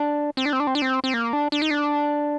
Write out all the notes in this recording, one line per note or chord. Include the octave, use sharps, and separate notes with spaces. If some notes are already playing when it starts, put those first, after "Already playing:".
Already playing: D4
C4
D4
C4
D4
C4
D4
C4
C4
A#3
D4
D4
D#4
D4